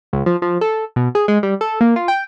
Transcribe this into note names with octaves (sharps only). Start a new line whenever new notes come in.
C#2
F3
F3
A4
B2
G#4
G#3
G3
A4
A#3
F4
G5